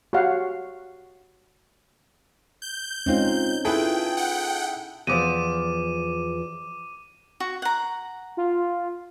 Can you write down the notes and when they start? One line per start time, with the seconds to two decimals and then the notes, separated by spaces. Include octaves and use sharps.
0.13 F#4 G4 C#5 F5 F#5
2.62 G6
3.06 G#3 C4 C#4 D#4 F4
3.65 E4 F4 G#4 A4 B4 G5
4.17 F#5 G5
5.07 E2 F3 D5 D6 D#7
7.40 F#4
7.62 F#5 A#5
8.37 F4